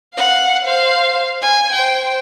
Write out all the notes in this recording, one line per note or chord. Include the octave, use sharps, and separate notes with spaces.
F5 F#5
C5 F5
G#5
C5 G5